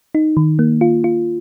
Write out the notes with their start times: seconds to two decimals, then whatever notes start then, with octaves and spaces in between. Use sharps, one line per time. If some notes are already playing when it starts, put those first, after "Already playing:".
0.15 D#4
0.37 D#3
0.59 A#3
0.81 F4
1.04 F4